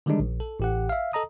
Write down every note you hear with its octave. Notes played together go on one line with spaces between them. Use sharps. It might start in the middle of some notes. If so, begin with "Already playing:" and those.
D3 D#3 G3 G#3 D4 D#4
A#1
A4
A1 G4 F#5
E5 F5
A4 D#5 A#5 D#6